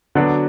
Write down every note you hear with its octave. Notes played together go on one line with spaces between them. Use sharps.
D3 F#3 B3 D4 F#4